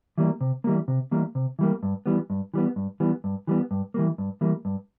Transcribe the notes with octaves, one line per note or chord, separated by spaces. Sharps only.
E3 G3 A#3
C3
E3 G3 A#3
C3
E3 G3 A#3
C3
E3 G3 A#3
G2
E3 G3 B3
G2
E3 G3 B3
G2
E3 G3 B3
G2
E3 G3 B3
G2
E3 G3 A#3
G2
E3 G3 A#3
G2